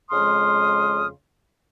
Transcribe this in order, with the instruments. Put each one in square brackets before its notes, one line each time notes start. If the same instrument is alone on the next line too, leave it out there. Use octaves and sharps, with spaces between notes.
[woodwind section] F2 C#3 G#3 C6 D#6 F6